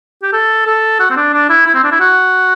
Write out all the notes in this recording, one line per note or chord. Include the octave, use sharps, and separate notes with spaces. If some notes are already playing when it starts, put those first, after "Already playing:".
G4
A4
A4
F#4
C4
D4
D4
E4
E4
C4
D4
E4
F#4